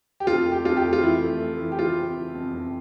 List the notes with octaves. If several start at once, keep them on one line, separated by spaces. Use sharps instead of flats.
G4
F2 F4
A3
G4
F2 F4
G4
A3
F4
E3 E4
A3
A3
E3
G4
E3 F4
C4
E3
F2
F2